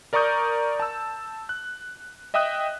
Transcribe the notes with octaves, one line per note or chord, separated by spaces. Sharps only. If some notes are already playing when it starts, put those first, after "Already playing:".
A#4 D5 A#5 C#6 D#6 G6
A5 E6
F#6
D#5 E5 G5 D#6 F#6